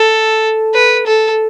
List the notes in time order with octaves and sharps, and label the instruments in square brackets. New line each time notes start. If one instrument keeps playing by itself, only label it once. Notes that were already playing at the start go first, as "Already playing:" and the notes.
Already playing: [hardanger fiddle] A4
B4
A4